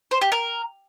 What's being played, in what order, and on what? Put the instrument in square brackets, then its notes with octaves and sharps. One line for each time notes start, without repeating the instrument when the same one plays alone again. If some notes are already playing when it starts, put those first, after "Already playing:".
[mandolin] C5
G4
A#4